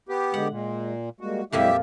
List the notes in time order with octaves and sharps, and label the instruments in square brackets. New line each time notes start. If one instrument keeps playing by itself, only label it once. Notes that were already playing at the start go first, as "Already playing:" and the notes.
[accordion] B3 G4
[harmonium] D3 G#3 [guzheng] F#5
[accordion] A#2 [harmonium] G#3
[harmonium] G3 G#3 A#3 [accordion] F#4
[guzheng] F2 A#2 F3 [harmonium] F#3 G#3 E4 [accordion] G4 E5